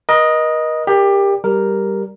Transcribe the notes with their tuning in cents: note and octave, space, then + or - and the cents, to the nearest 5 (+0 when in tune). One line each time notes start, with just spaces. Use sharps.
A#4 +45 D#5 +0
G4 +20 A#4 +5 D5 +0
G3 +0 A#4 +0